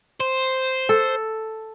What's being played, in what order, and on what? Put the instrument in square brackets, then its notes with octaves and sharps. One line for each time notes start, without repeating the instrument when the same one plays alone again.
[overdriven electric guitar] C5
[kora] A4